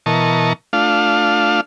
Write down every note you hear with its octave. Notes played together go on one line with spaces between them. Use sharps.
B2 E3 A#4 D#5 A5 C#6
A3 D4 F4 F5